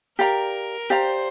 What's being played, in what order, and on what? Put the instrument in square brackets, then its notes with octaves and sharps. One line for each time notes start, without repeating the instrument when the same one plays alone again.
[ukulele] G4 D5 F5 A#5 [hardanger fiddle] A#4
[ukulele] G4 D5 F5 A#5 [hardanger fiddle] C5